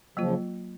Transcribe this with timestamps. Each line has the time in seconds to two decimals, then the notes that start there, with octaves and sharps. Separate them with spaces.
0.17 C#3 F3 F#3 A#3 F4